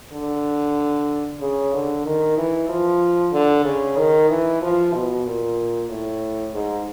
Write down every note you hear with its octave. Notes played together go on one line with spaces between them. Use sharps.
D3
C#3
D3
D#3
E3
F3
D3
C#3
D#3
E3
F3
B2
A#2
A2
G#2